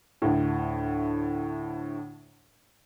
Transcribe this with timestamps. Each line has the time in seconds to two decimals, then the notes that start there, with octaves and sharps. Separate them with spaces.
0.22 D2 A2